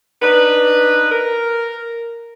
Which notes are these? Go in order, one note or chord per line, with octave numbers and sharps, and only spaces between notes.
D4 D#4 B4
A#4